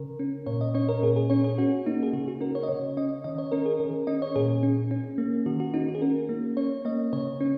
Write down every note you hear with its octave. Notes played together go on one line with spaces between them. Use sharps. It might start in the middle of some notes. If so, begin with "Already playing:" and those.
Already playing: C#3 A#4
C#4
A#2 C#5
D#5
C#4 C#5
A#4
A#2 G#4
G#4
C#4 C#5
G#4
C#4 F#4
A#3 D#4
G#4
C#3 F#4
F#4
C#4 A#4
C#5
D#5
C#3 C#5
C#4 D#5
D#3 D#5
C#5
C#4 A#4
G#4
D#3 A#4
C#4 D#5
C#5
A#2 G#4
C#4
C#4
A#3
D#3 F#4
F#4
C#4 D#4
F#4
G#4
C#4 A#4
A#3
C#4 C#5
A#3 D#5
C#3 C#5
C#4